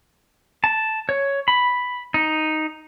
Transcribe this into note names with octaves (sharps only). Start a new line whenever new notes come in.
A5
C#5
B5
D#4